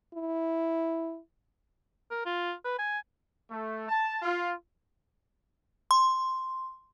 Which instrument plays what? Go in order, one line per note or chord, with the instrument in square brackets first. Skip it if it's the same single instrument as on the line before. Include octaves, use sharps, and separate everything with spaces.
[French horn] E4
[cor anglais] A#4
F4
B4
G#5
[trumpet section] A3
A5
F4
[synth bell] C6